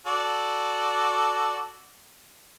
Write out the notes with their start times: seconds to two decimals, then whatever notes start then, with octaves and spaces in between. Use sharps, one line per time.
0.07 F#4 A4 D5